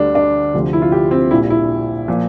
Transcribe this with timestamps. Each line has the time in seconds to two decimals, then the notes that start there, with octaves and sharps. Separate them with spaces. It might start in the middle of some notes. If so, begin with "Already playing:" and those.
Already playing: D2 D3 G3 D4
0.15 D4
0.54 D2 C3 F3
0.73 E4
0.82 F4
0.92 G4
1.11 C4
1.31 A#1 A#2 G3 E4
1.50 E4
2.08 A#2 F3